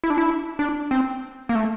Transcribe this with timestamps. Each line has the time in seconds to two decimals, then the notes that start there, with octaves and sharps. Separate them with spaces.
0.04 E4
0.10 D4
0.18 E4
0.59 D4
0.91 C4
1.49 A#3
1.55 A3